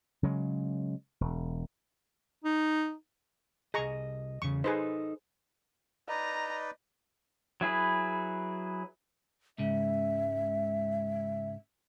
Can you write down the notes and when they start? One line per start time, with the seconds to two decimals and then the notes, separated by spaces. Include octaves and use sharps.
0.23 C#3 F#3 G#3
1.21 E1
2.45 D#4
3.74 C2 G#4 D#5 A#5 C#6
4.42 E2 C#3 C#6
4.64 D#4 G#4 A4 B4 C5 D#5
6.09 D#4 B4 D5 D#5 A#5
7.61 F#3 E4 G#4 B4
9.58 C#2 G#2 C#3 E5